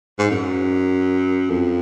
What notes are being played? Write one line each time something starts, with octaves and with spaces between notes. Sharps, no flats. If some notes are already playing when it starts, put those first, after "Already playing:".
G#2
F#2
F2